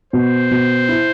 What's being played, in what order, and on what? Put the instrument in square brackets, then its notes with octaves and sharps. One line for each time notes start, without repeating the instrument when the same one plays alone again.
[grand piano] B2 [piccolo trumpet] C5
[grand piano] B2
E4